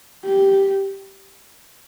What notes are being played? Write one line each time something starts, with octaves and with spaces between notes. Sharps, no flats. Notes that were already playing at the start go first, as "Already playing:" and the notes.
G4